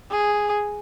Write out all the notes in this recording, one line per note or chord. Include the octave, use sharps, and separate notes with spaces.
G#4